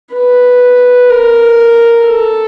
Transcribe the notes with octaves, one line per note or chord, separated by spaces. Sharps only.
B4
A#4
A4